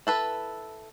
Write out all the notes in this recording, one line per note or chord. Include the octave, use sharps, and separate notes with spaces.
E4 A4 B4